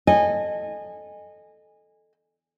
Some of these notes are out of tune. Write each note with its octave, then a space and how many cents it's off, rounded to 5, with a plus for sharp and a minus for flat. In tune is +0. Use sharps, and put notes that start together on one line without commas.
A4 -10 D#5 -20 G#5 -20